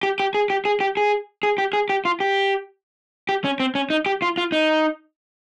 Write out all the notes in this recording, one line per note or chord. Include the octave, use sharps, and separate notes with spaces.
G4
G4
G#4
G4
G#4
G4
G#4
G#4
G4
G#4
G4
F4
G4
G4
C#4
C4
C#4
D#4
G4
F4
F4
D#4